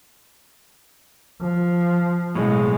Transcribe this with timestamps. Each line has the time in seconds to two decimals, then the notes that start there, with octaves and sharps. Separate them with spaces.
1.42 F3
2.35 B1 A2 G#3